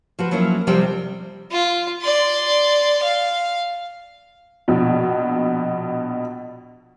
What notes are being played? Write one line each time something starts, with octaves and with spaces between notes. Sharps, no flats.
F3 F#4 B4
F3 F#3 A#3 C#4 E4
C3 F3 G3 C4 D5 G5
F4
D5 C6
F5
A#1 B2